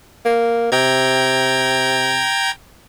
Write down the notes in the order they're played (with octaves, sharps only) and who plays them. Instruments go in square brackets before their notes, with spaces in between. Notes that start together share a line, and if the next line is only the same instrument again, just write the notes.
[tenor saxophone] A#3
[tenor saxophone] C3 [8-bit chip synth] G5 A#5 G#6